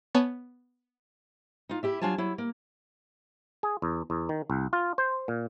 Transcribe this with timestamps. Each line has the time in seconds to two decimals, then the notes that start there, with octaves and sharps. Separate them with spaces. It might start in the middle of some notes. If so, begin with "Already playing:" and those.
0.14 B3 C#5 G#5 A5 B5 C#6
1.69 D#4 F4
1.83 E4 G4 E5
2.02 F#3 D4 F4 G#5 A5
2.18 F#3 E4
2.38 A#3
3.63 G#4
3.82 E2
4.10 E2
4.29 D#3
4.50 C2
4.73 F4
4.98 C5
5.28 A#2